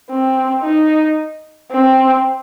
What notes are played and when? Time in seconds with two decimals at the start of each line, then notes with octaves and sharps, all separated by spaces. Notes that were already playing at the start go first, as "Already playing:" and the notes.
0.10 C4
0.63 D#4
1.71 C4